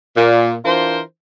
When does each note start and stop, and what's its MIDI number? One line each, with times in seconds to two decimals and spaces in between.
0.17 0.54 46
0.65 1.00 52
0.65 1.00 62
0.65 1.00 65
0.65 1.00 70
0.65 1.00 72